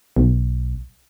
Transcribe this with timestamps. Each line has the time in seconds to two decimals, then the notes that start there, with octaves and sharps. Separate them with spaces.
0.17 B1